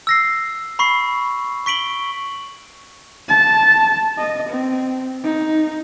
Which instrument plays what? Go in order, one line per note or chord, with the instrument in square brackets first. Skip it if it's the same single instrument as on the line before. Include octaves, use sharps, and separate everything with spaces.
[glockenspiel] E6 A#6 C7
B5 C#6 C7
C#6 B6 D7 F#7 G7
[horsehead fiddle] A5
D#5
C4
D#4